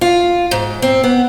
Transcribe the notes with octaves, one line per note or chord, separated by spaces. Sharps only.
F4
G#2
C4
B3